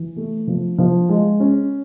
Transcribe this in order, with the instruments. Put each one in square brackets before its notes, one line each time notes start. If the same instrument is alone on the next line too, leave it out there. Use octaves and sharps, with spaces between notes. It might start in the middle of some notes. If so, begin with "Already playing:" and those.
Already playing: [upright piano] E3
A3
F3
F3
G#3
C#4